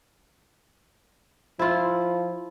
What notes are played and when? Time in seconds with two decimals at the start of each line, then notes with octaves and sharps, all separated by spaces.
1.59 F3 E4 F4